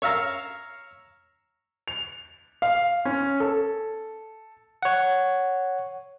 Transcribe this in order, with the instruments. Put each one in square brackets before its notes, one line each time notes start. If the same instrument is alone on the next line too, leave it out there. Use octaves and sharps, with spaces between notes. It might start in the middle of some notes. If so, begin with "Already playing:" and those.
[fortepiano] C#5 E5 F5 A#5
[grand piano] F7
F5
C#4
A4
[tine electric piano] C#5 F#5